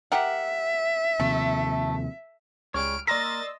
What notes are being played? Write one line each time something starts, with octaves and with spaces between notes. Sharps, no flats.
G4 A#4 E5 F#5
D#2 C3 F3 A3
C#2 G3 G#3 C#5 F6 D7
A#3 A#4 D5 D#5 C6 E6 A6 A#6